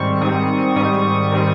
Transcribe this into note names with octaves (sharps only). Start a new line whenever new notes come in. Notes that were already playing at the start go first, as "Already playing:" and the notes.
Already playing: G#2 D#3 G3 C4 C#6
G#2 D#3 G3 C4 D#6
G#2 D#3 G3 C4 D#6
D#3 G3 C4